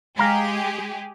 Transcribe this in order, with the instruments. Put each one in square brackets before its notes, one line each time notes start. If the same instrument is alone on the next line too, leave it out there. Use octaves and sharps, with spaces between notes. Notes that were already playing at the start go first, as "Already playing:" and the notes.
[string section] G#3 G4 G#4 [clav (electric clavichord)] F5 A#5